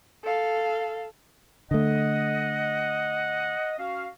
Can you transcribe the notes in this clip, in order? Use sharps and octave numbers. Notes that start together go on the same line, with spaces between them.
A4 F5
D3 A3 D#5 F#5
C#4 F#4 F5